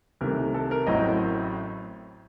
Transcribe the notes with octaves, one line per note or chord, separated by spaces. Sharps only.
C2 C3 D#3 A3 A#4
A4
A#4
A1 A2 F#3 C4 D#5